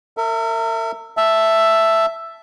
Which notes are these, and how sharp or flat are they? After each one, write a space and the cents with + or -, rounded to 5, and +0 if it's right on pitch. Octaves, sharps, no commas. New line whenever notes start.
A#4 -40 E5 +0
E5 +5 A5 +0